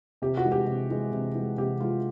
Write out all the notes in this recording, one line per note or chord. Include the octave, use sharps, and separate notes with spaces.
C3 G4
F#4
E3 G#3
G4
C3
E3 G#3
C3
E3 G#3
C3 G4
E3 G#3 F4